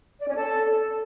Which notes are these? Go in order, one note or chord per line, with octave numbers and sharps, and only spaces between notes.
D5
C#4
A4